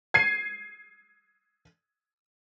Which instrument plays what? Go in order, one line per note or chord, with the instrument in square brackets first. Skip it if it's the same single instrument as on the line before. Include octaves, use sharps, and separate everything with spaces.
[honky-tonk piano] G#6 C7 D#7